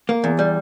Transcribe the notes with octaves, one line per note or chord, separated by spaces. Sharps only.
A#3
E2
G3